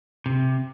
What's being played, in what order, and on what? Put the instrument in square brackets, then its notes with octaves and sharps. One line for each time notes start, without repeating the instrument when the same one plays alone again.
[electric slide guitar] C3